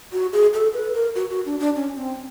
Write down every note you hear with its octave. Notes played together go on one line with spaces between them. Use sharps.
F#4
G#4
A4
B4
A#4
F#4
F#4
D4
D4
C#4
C4